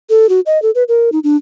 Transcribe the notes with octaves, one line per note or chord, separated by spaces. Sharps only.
A4
F#4
D#5
A4
B4
A#4
D#4
D4